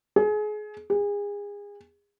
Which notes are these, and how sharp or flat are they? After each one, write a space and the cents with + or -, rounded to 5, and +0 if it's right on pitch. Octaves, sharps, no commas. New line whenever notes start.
G#4 +30
G#4 -30